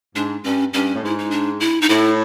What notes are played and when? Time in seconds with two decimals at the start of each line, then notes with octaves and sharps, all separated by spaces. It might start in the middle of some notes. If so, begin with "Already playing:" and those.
0.15 G#2 D4
0.44 G2 C#4
0.74 G2 C#4
0.95 A2
1.03 G#2 E4
1.18 D#4
1.31 D4
1.60 E4
1.82 D#4
1.89 A2 E4